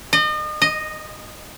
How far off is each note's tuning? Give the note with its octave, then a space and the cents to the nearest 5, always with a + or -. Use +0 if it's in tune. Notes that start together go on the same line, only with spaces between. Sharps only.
D#5 -35
D#5 -5